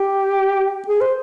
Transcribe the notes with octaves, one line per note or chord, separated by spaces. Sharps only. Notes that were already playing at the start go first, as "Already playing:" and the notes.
Already playing: G4
G#4
C5